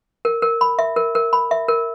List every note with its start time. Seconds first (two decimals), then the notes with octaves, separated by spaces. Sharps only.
0.25 A#4
0.42 A#4
0.61 B5
0.79 E5
0.96 A#4
1.15 A#4
1.33 B5
1.51 E5
1.68 A#4